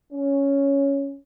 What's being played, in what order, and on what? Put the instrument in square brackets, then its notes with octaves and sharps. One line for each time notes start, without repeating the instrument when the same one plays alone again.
[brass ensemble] C#4